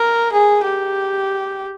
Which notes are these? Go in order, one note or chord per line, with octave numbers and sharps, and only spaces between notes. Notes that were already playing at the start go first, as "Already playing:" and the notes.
Already playing: A#4
G#4
G4